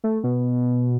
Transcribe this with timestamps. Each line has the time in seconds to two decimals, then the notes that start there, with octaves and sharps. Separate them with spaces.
0.04 A3
0.24 B2